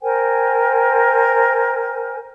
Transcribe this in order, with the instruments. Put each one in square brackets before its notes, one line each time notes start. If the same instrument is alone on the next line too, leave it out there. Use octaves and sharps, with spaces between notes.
[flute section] A#4 C5 G5 G#5